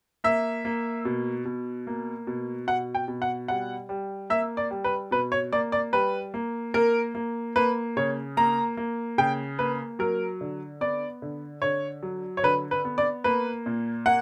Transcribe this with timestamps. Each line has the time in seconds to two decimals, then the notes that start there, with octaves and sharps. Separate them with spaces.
0.24 A#3 E5
0.65 A#3
1.05 B2
1.45 B2
1.87 A#3
2.27 B2
2.67 B2 F#5
2.95 G5
3.08 B2
3.22 F#5
3.48 G3 F#5
3.89 G3
4.30 A#3 E5
4.57 D5
4.71 G3
4.84 B4
5.11 B2 B4
5.32 C#5
5.52 A#3 D5
5.72 D5
5.93 G3 B4
6.34 A#3
6.74 A#3 A#4
7.15 A#3
7.56 A#3 B4
7.97 C#3 C#5
8.37 A#3 A#5
8.77 A#3
9.18 C#3 G5
9.59 A#3 B4
9.99 F#3 A#4
10.41 D3
10.81 B3 D5
11.22 D3
11.62 D3 C#5
12.03 F#3
12.37 C#5
12.43 D3 B4
12.71 B4
12.85 B3
12.98 D5
13.24 A#3 B4
13.66 A#2
14.06 A#3 F#5